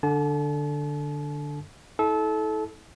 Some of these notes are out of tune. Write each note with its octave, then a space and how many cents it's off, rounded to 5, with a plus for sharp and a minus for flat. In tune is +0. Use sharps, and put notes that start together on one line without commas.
D3 +0 A5 -40
E4 -40 A4 -25